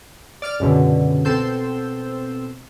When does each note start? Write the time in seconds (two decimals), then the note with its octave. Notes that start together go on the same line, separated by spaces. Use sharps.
0.42 D5 F6 D7
0.60 C#2 F#2 B2 D3
1.25 B2 C4 A4 C6 E6 G6